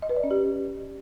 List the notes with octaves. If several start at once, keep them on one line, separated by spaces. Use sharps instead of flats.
D#5
B4
D5
C#4
G4